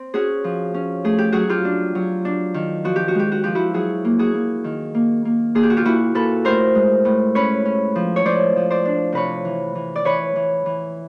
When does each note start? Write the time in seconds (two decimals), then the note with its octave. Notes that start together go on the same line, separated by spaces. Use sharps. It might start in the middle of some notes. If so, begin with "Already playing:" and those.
Already playing: C4
0.14 C#4 F#4 G#4
0.44 F3
0.74 C#4
1.04 A3 G#4
1.18 G4
1.32 F#3 F#4 G#4
1.49 F4 G4
1.65 D4
1.95 F#3
2.25 D4
2.54 D#3
2.84 F3 F#4
2.96 G4
3.08 F#4
3.15 G#3 G4
3.32 F#4
3.44 F3 G4
3.55 E4 F#4
3.74 F#3 F#4 G#4
4.05 A#3
4.19 F#4 G#4
4.34 A#3
4.64 D#3
4.95 A#3
5.25 A#3
5.55 A#2 G#4
5.63 G4
5.70 F#4
5.77 F4 G4
5.85 A#2 E4 F#4
6.15 A#2 A4 B4
6.45 A2 A#4 C5
6.75 G#3
7.05 A2
7.35 C#4 B4 C#5
7.65 C#4
7.95 F3
8.16 C#5
8.25 F3 C5 D5
8.56 F3
8.70 C5 D5
8.85 D4
9.12 C3 B4 C#5
9.45 E3
9.75 E3
9.96 D5
10.05 E3 B4 C#5
10.36 E3
10.66 E3